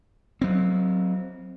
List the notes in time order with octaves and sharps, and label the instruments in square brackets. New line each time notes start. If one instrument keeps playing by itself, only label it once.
[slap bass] F#3 C4